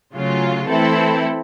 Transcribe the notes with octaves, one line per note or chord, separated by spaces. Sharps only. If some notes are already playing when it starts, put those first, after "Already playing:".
C#3 F#3 A3 C#4 F4
E3 A3 C4 E4 A4